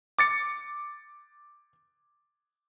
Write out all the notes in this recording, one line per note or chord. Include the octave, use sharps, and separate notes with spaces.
D6 A6 C#7